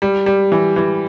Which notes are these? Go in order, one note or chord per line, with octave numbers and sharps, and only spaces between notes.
G3
G3
E3
E3